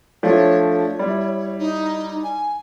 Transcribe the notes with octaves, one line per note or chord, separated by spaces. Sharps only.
F3 A3 D4 C#5
C#5
G3 E4
D#4
G#5